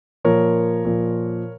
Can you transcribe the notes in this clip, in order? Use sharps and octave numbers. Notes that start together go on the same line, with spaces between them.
A#2 F3 A#4 C#5
A#2 F3